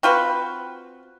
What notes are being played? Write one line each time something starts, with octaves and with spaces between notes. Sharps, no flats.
C4 F4 F#4 B4